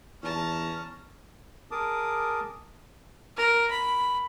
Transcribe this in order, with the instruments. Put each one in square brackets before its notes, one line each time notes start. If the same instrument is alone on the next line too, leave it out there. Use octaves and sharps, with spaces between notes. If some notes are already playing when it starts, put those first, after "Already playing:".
[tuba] E2 [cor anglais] C#4 [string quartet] A5 A#5
[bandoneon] G#4 A#4 A5 D6 D#6
[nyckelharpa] A#4
B5